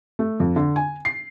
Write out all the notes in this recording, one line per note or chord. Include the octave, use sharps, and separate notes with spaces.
A3
F2
D3
G#5
C7